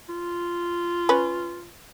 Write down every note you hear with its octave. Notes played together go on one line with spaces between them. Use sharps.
F4
C#4 B4